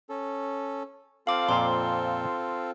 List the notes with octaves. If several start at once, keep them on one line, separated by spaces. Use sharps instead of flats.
C#4 A4
C4 F4 A4 F5 D6
F2 A#2 C6